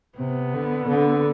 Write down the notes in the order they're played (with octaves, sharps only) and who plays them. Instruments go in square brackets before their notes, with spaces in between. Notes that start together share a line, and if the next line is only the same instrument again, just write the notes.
[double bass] C3 [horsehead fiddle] B3
[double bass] D3
D3